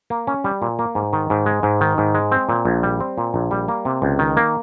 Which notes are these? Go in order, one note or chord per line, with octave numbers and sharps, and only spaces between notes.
A#3
C#4
G3
A#2
A#3
G#2
D#3
G#2
G#3
G#2
D#3
G#2
G#3
C4
A#2
A#1
G3
C4
A#2
A#1
G3
A#3
C3
C#2
D#3
A#3